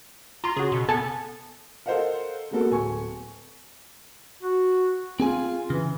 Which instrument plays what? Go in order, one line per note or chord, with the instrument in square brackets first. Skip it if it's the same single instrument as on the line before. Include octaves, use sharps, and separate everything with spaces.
[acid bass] F4 [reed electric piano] A#5 C6
[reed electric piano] C#3 F#4 [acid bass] G#4
[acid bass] B2
[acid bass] B3 [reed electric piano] A4 G#5 A5
[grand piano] A4 A#4 C5 D#5 F5 F#5
G#3 A#3 B3 F#4 A4 A#4
D1 G#5 C#6
[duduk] F#4
[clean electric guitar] C4 G#4 G#5 [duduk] F4
[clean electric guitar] C#3 [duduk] E3